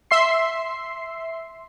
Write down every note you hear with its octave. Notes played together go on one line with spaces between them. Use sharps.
E5 C6 C7